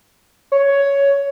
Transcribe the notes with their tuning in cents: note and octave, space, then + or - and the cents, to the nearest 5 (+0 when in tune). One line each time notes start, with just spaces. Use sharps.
C#5 +10